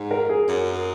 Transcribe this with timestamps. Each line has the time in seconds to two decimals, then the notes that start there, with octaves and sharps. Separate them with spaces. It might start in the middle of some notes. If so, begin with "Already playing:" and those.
Already playing: G#2
0.11 A#4
0.29 G#4
0.49 F#2